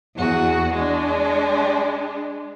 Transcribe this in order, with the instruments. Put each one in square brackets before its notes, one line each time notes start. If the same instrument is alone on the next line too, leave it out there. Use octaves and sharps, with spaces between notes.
[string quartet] E2 F#4 G#4
G#3 D4